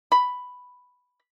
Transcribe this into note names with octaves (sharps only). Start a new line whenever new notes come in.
B5